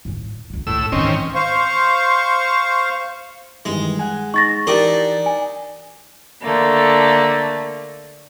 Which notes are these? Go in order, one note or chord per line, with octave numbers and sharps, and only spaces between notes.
G#1 A2
C#2 B3
G#1 C#2 A2 E6
G#2 D#3 E3 C4 C#4
C5 F5 C#6
G2 D#3 E3 G#3
F#5 G#5
D#4 C#6 A6 A#6
E3 D4 D#4 G4 A#4 A6
G#5
D3 A3 A#3